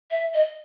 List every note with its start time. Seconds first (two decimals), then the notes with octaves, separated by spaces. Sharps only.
0.11 E5
0.34 D#5